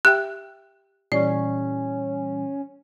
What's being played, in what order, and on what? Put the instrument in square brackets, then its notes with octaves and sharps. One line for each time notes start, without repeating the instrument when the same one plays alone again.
[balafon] G4 E5 G5 [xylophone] F#6
[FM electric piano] A#2 E3 G3 [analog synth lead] C#4 [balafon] D5